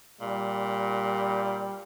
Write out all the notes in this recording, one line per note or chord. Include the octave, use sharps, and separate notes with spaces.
A#2 G3